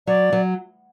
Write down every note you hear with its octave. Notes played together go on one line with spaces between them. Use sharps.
F#3 D5
F#3